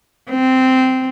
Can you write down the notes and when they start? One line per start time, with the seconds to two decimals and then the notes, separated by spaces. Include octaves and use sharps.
0.30 C4